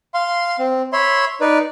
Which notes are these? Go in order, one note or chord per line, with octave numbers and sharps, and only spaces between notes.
F5 C6
C4
C#5 E5 B5 C6
D#4 B4 D5